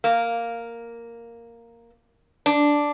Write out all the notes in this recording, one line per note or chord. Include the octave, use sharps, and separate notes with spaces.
A#3
D4